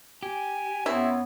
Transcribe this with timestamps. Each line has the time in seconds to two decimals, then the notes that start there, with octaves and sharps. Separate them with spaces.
0.23 G4 G#5
0.86 F#2 B3 C4 E4 C#5